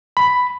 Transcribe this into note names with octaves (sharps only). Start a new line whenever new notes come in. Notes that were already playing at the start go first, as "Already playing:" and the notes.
B5